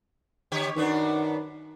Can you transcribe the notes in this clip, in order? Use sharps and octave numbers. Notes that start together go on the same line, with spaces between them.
D3 G4 C#5
F#2 D#3 B3 D4